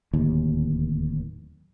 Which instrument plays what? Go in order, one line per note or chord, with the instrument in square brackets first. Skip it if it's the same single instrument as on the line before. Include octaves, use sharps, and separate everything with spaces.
[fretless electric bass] D1 D#2